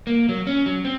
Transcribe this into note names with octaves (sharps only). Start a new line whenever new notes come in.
A#3
F#3
C#4
F#3
C4